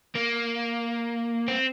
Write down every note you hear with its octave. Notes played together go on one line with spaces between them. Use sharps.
A#3
C4